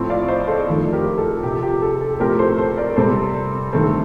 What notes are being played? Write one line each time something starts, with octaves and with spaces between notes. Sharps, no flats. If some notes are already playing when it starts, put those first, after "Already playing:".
Already playing: A2 F3 A3 C4
D5 F5
C5 D#5
A4 C5
F2 D#3 A3
G4 A#4
A4
C3 F3 C4 G4
G4
A4
A4
A2 F3 A3 C4 G4 A#4
A4 C5
A4 C5
A#4 D5
C3 G3 C4 A4 C5
G2 D#3 A3 C4 A4